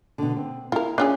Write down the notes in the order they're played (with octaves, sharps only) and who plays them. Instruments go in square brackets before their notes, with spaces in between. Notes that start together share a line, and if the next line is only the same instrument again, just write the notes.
[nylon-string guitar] B2 D3
C4
[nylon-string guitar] E4 [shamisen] F4 A#4
[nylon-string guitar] C#4 [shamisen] D4 F4 G#4